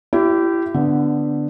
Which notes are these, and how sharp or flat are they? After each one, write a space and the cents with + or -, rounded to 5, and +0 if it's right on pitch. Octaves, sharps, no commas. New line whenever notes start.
E4 +25 G4 -20
D3 +0 B3 +0